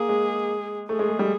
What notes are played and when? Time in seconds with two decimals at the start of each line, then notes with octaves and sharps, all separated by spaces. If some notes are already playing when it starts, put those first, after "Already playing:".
Already playing: A#3 G#4
0.09 G#3
0.89 A3 G#4
0.99 G#3
1.09 A3
1.19 G3